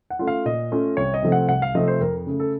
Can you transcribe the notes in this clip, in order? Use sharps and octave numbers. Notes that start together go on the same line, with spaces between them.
F#5
A3 C#4 F4
F5
A#2 D#5
A3 C#4 F4
C2 C#5
D#5
C3 F3 A3 C4
F#5
C2 F#5
F5
C3 F3 A3 C4 D#5
C5
F2 A#4
C#3 A3
A4